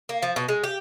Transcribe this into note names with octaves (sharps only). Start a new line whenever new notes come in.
A#3
F3
B2
G#3
G4